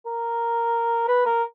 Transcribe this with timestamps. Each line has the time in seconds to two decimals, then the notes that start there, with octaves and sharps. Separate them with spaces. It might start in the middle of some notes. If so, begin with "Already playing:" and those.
0.06 A#4
1.07 B4
1.25 A#4